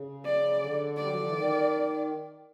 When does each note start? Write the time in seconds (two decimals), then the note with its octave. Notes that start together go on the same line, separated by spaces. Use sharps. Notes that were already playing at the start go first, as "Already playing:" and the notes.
Already playing: C#3
0.25 D5
0.61 D3
0.97 G3 D5
1.07 F#3
1.16 F3
1.25 E3
1.34 D#3